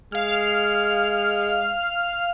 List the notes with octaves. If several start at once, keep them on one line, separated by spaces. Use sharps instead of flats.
G#3 F5 F6